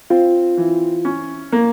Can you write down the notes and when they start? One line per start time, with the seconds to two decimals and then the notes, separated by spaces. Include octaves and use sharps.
0.10 C4 F4
0.57 E3
1.05 C#4
1.52 A#3